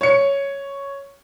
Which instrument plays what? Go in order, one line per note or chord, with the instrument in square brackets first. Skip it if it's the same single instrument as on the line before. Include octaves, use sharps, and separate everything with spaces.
[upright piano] C#5 C#7